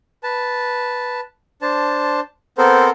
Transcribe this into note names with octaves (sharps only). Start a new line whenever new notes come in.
B4 A5
D4 C5 A5
B3 C4 A4 A#4 C5